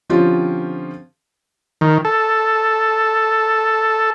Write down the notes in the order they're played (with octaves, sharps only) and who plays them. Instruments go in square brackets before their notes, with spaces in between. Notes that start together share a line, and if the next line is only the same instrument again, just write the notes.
[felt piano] D3 F3 C4 C#4 F4 G4
[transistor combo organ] D#3
A4